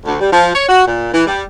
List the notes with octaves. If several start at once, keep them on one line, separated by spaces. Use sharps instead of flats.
D2
G3
F3
C#5
F#4
A#2
E3
G3